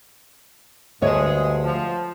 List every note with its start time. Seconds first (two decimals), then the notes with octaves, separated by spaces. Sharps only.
1.02 D2 G2 G#3 C#5
1.63 F3